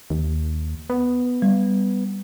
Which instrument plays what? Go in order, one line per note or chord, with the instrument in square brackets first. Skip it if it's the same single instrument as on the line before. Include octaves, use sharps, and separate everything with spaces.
[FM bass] D#2
B3
[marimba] G3